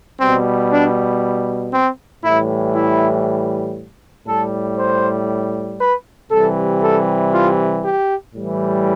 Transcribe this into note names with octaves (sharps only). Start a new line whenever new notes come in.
B2 G3 C4
D4
C4
A2 E3 G3 E4
E4
A2 G3 A4
C5
B4
C3 E3 G3 A4
A4
F4
G4
A2 E3 G3